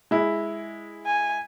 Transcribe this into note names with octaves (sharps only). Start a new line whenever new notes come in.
G#3 E4
G#5